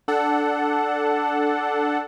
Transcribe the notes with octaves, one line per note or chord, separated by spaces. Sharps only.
D4 A4 F#5